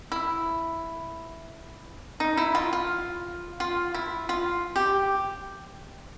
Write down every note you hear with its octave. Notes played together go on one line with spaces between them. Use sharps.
E4
D#4
E4
F4
F4
F4
E4
F4
G4